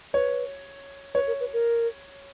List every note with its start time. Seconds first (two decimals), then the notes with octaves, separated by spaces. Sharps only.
0.14 B4 C#5
1.15 B4 C#5
1.27 A#4
1.40 B4
1.53 A#4